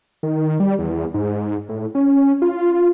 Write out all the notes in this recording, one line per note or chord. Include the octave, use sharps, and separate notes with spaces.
D#3
G3
E2
G#2
A2
C#4
F4